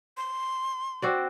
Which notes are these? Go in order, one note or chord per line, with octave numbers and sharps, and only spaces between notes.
C6
C4 F#4 D5